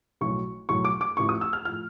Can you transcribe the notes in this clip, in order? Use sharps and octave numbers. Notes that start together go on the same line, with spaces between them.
B1 A2 F#3 C#6
B1 A2 F#3 C#6
D6
D6
A1 A2 F3 C#6
D#6
E6
F6
A2 F3 F6